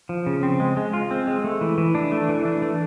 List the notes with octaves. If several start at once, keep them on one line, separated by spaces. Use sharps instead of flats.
F3
C#3
C4
G#3
G#3
F4
C4
G#3
A3
E3
E3
D4
A3
E3
D4
A3